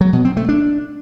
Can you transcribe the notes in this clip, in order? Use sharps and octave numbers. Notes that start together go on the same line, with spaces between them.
F#3
B2
C4
A3
D4